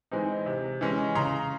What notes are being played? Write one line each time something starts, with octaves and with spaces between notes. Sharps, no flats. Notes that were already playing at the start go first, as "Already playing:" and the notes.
E3 G#3 C4 D#4
C3
E3 G#3 C#4
C#3 A#5 C6